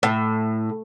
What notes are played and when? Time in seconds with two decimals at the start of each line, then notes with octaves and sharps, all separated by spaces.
0.03 A2